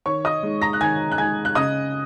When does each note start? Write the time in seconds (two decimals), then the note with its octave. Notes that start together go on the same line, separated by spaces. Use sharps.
0.06 D#3 C#5 C#6
0.25 D#5 D#6
0.43 G#3 D#4
0.62 A#5 A#6
0.73 F#6
0.81 D#3 G#5 G#6
1.12 F#6
1.18 G#3 D#4 G#5 G#6
1.45 F#6
1.55 C#3 D#5 D#6